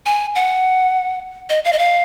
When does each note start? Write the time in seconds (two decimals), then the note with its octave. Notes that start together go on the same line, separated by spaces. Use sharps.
0.06 G#5
0.35 F#5
1.50 D#5
1.65 F5
1.73 D#5
1.79 F5